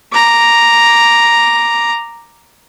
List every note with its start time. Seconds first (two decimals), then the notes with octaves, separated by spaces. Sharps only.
0.12 A#5 D6